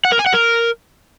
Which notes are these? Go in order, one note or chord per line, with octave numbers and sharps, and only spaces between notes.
F#5
A#4
G#5
F#5
A#4